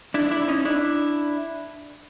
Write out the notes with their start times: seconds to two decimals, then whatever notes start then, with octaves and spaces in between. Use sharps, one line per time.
0.14 D4 E4
0.31 D4 E4
0.48 C#4 D#4
0.65 D4 E4